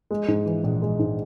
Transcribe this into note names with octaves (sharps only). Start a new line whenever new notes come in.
G#3
G#2
E3
A#1
G#3
G#2